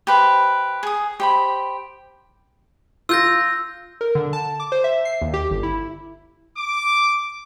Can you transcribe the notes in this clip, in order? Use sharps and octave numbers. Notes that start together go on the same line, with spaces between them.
G4 B4 C5
G#4 D#6
G4 C5 B5
F4 E6 G6 A#6
A#4
D3
A5
D6
C5
E5
C7
D#2
G4
G1
E4
D6